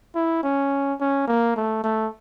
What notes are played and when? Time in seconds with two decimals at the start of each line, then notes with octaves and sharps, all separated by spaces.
0.15 E4
0.43 C#4
1.00 C#4
1.28 A#3
1.56 A3
1.84 A3